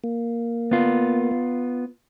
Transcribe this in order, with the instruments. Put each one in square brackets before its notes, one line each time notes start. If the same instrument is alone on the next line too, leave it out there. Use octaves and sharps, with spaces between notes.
[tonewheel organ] A#3
[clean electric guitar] B3 F4